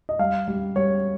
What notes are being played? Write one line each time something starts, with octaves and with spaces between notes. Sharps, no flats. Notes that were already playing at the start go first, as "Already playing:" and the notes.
D#5
G3 F5
G3
G3 C#5